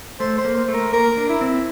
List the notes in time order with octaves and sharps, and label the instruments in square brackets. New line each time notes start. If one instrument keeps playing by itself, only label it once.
[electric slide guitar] A3 [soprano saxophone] C5
[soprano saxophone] C5
[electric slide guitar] A#3
[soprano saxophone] C5
[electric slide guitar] A3
[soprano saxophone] A#4
[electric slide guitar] A#3 [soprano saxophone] A#4
[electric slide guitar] D4
[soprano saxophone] E4
[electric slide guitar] C4